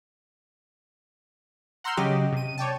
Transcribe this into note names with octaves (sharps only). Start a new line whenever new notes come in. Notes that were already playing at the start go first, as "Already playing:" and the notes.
F#5 A#5 C6 E6 F6 G6
C#3 F#3 G4 D#5 D6
C3 D#7
C#5 D5 G5 A5